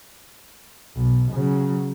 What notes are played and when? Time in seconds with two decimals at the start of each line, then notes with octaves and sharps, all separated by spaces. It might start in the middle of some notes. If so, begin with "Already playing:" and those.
0.96 B1
1.32 C#3 F#3